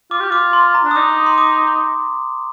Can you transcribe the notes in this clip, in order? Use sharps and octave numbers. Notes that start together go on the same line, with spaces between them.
F4 D6
G4
F4 D6
C6
A#5
D4
D#6
D#4 D6
C6
D6